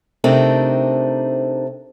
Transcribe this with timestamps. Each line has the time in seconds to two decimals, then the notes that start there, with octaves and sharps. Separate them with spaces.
0.24 C3 A3 C4 D4 D#4 A#4